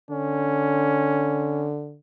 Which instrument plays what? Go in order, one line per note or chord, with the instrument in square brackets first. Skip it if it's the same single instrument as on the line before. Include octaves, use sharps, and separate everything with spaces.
[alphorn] D3 [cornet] C#4